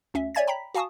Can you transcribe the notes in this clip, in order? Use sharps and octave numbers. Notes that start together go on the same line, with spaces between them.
D2 C#4 E5
C#5 D5 E5 G#5 G#6 A6
G5 A#5 B5 B6
F#4 F5 G#5 A5 C#6 D#6